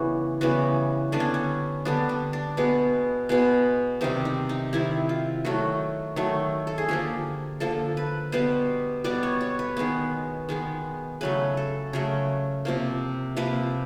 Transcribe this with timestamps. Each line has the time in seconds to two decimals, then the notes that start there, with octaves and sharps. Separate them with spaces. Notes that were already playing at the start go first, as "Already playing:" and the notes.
Already playing: C#3 E3 G3 B3 F#4
0.41 C#3 E3 G3 B3 F#4
1.12 D3 G3 B3 D4
1.20 C#4
1.34 C#4
1.85 D3 G3 B3 D4
2.09 D4
2.33 D4
2.57 B2 G#3 B3
3.29 B2 G#3 B3
4.01 C3 D#3 G3 D#4
4.25 D#4
4.49 D#4
4.73 C3 D#3 G3 E4
5.09 F4
5.45 D#3 F#3 A3 F#4
6.16 D#3 F#3 A3
6.67 A4
6.78 G#4
6.89 D3 F3 A#3 G4
7.60 D3 F3 A#3 A4
7.97 B4
8.32 B2 G3 B3 C5
9.04 B2 G3 B3 D5
9.23 C#5
9.41 C#5
9.59 B4
9.77 D#3 G#3 B3
10.49 D#3 G#3 B3
11.21 C#3 F#3 A3 B4
11.57 A4
11.93 C#3 F#3 A3 A#4
12.65 C3 F3 A#3
13.36 C3 F3 A#3 B4